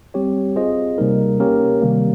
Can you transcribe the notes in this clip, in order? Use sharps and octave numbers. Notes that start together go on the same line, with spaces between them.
G3 C4 G4 C#5
C4 F4 G#4 C5 D#5
C3 G3 A#3 D#4 A#4
A#3 C#4 G4 A#4 C#5
C3 D#3 G3 A#3